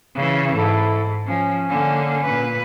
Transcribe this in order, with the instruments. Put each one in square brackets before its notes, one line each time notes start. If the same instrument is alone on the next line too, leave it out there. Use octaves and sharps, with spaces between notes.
[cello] C#3 E3
[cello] G#2 [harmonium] E4 A4
[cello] F3 [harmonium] C#4
[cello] D3 A#3
A#2 B4